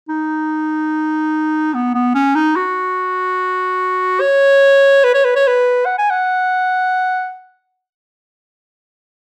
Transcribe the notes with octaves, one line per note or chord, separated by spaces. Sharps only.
D#4
B3
B3
C#4
D#4
F#4
C#5
B4
C#5
B4
C#5
B4
F#5
G#5
F#5